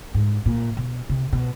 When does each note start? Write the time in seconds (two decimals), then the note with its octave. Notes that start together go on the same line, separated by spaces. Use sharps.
0.14 G#2
0.46 A#2
0.77 B2
1.09 C3
1.33 B2